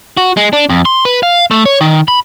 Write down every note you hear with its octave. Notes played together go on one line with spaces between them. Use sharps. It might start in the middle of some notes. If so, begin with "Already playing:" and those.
F#4
G#3
D4
F2
C6
B4
F5
A3
C#5
D#3
B5